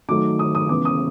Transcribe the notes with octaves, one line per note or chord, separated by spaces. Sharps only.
D#3 F#3 A3 D6
D#6
D#6
C#3 E3 G#3 B3 D6
D#6